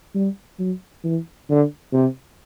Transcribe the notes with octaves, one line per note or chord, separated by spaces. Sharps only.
G3
F#3
E3
D3
C3